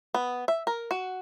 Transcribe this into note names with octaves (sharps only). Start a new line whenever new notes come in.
B3
E5
A#4
F#4